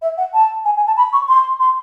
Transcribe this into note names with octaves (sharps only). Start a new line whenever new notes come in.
E5
F#5
A5
G#5
G#5
A5
B5
C#6
C6
C6